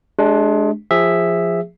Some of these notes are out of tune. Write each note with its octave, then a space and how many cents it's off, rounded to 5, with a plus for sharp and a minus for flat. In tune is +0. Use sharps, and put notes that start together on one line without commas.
G#3 +30 D4 +0 G4 +0
F3 +0 G#4 -20 E5 +0